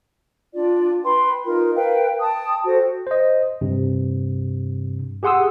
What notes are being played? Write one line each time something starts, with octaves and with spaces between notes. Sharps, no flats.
D4 F4 D5
B4 G5 B5 C6
D#4 F4 A#4
A#4 B4 F5 G5
G5 A5 D#6
F#4 A4 C5 G5
C5 D#5
G2 C3
G4 G#4 F#5 C6 D#6 E6